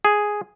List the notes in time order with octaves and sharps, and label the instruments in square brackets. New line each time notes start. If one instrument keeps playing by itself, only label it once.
[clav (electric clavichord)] G#4